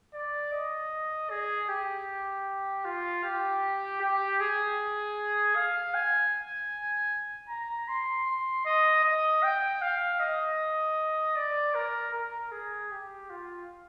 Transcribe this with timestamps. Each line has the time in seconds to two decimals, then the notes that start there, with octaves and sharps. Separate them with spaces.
0.14 D5
0.53 D#5
1.30 G#4
1.68 G4
2.85 F4
3.24 G4
4.01 G4
4.40 G#4
5.55 F5
5.94 G#5
7.49 A#5
7.88 C6
8.26 C6
8.65 D#5
9.04 D#5
9.43 G5
9.82 F5
10.20 D#5
11.36 D5
11.75 A#4
12.13 A#4
12.52 G#4
12.91 G4
13.30 F4